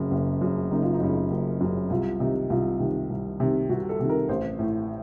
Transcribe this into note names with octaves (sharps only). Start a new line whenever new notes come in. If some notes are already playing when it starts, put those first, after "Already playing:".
Already playing: F#1 F#2 C#3
F#1
F#2 C#3
F#1 D#4
F4
D#4
F#2 C#3
F#1
F#2 C#3
C2 F4
C3 D#3 D#4
C2 F4
C3 D#3
C2
C3 D#3
C2 F#4
A4
C3 D#3
A#4
A1 C5
A2